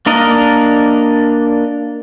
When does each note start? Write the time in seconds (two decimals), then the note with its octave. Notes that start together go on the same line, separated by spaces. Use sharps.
0.06 A#3 D4 A#4 D#5